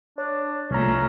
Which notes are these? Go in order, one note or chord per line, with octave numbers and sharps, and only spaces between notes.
D4 C#5
C2 F3 A3 C#4 A#5